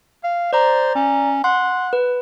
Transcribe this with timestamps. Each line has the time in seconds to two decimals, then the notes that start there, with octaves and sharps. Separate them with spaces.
0.24 F5
0.53 C5 D5 A#5
0.95 C#4
1.44 F#5 C6
1.93 B4